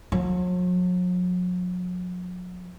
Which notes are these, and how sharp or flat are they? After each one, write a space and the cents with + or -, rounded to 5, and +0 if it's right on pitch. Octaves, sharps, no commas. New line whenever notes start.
F#3 -45